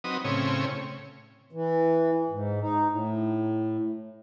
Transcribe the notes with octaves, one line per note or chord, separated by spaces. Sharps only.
F#3 C4 D#4 B4 D#6
A2 C#3 C4 C#5
E3
G#2
D#4
A2